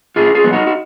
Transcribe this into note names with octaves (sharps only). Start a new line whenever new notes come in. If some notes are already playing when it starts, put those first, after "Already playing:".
A#2 F4 G#4
F4 G#4
F#3 B3
D#4 F#4
F#4